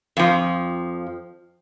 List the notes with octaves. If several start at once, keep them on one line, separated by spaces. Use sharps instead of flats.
F2 F3